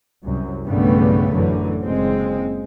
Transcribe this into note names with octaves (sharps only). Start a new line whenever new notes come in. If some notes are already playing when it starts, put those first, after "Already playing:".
C2 F#2
B1 G2 C#3 G3 A3 B3
A1 F#2 D3 E3
F#1 G#3 C4